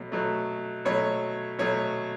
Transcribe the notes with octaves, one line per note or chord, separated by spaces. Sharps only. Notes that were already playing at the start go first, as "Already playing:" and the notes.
Already playing: B2 F#3 A3
B2 F#3 A3
B2 F#3 A3 C#5
B2 F#3 A3 C#5